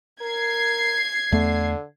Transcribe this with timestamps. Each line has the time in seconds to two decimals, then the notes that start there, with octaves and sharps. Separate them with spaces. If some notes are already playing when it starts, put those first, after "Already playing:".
0.21 A#4 G#6 C7
1.32 E2 D3 A3